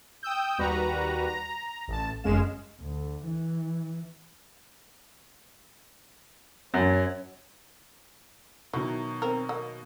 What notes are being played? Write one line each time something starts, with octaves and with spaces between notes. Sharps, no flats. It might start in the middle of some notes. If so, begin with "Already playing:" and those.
G5 D#6 E6 G6
D#2 G3 F#4 B4 A#5
A#5
A1 A5
G1 F#2 G#3 C#4 F5 E7
D2
E3
F#2 C#5
B2 D#3 F#3 E4
C4 A#4
A#3 D#5